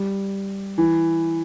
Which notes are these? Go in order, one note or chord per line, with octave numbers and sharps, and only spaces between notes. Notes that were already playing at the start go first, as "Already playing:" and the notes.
Already playing: G3
E3